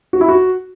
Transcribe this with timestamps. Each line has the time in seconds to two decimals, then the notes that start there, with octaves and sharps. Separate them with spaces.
0.13 F#4
0.21 E4
0.28 F#4